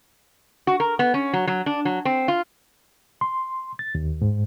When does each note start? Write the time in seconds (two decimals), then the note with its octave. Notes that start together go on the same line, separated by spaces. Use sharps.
0.67 F#4
0.80 A#4
0.99 B3
1.14 C#4
1.33 F#3
1.47 F#3
1.66 D4
1.85 F#3
2.05 C4
2.28 F4
3.21 C6
3.79 A6
3.95 D#2
4.22 G#2